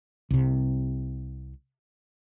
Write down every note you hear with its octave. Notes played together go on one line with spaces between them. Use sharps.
C2 C3